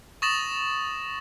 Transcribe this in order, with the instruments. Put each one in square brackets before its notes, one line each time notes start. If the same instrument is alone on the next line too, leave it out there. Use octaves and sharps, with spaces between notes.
[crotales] C#6 D#6 A6 A#6 E7 F#7